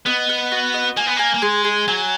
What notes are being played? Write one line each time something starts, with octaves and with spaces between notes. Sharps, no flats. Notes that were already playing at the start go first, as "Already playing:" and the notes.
B3 D#5
F#5
F#4
D#5
A#3 G#5
B3
A#3 G#5
A#3
G#3 G#4
G#4
F#3 G#5